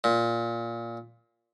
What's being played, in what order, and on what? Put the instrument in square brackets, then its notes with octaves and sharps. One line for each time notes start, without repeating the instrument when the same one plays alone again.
[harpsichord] A#2